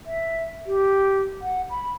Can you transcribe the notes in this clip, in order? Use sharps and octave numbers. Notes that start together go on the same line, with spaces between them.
E5
G4
F#5
B5